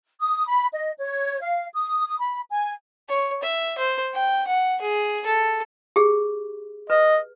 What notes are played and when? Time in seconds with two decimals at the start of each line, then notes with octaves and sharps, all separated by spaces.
0.20 D#6
0.47 B5
0.72 D#5
0.97 C#5
1.39 F5
1.73 D#6
2.06 D#6
2.18 B5
2.50 G#5
3.09 C#5
3.43 E5
3.78 C5
4.13 G5
4.47 F#5
4.81 G#4
5.26 A4
5.96 G4 G#4
6.90 B4 D#5